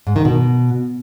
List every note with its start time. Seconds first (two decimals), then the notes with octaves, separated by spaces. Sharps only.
0.07 G#2
0.16 D#3
0.25 B2